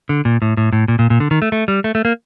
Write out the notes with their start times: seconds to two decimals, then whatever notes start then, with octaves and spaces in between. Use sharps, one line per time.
0.09 D3
0.25 A#2
0.42 A2
0.57 A2
0.73 A2
0.88 A#2
0.99 A#2
1.10 A#2
1.20 D3
1.31 D#3
1.42 A3
1.52 A3
1.68 G3
1.84 A3
1.95 A3
2.05 A#3